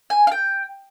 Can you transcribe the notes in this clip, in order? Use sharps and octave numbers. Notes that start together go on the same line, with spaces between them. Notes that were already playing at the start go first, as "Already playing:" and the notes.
G#5
F5
G5